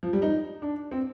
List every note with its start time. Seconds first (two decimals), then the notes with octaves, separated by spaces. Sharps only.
0.03 F3
0.13 G3
0.22 D#4
0.62 D4
0.91 C4